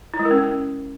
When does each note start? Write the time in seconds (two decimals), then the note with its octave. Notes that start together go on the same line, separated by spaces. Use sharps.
0.14 E4
0.19 G#3
0.25 A#4
0.31 C#4